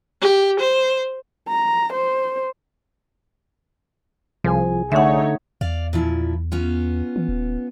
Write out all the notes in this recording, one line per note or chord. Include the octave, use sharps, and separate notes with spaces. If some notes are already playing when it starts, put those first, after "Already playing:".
G4
C5
A#5
C5
C2 F3 G#4 G#5
D3 A3 D#4 C#5 E5 F#5
E2 D5 F5
A#2 F3 E4
B3 C#4 F4
E3
D#1